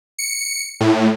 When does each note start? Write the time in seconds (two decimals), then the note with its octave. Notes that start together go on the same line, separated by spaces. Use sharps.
0.18 C#7
0.80 A2